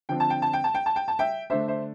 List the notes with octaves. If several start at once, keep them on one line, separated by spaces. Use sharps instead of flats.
D3 F3 C4 G5
A5
G5
A5
G5
A5
G5
A5
G5
A5
E5 G5
D3 A3 D4 C5 E5
C5 E5